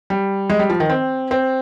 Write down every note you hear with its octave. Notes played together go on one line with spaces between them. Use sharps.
G3
G#3
G3
F3
D#3
C4
C4